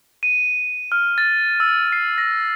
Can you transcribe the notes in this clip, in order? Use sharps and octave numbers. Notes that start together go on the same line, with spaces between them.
D#7
F6
A6
E6
C7
A#6